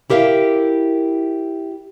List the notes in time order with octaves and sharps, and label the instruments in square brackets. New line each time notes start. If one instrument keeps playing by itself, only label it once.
[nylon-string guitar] E4 G4 A#4 E5 F5